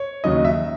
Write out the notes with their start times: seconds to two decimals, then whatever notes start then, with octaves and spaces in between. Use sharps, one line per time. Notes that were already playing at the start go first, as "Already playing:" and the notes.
Already playing: C#5
0.24 D#2 C#3 F#3 D#5
0.45 E5